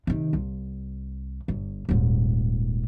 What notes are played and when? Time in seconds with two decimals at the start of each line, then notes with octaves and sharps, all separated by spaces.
0.07 C3 D#3
0.33 C2
1.48 G1
1.89 D#1 G#2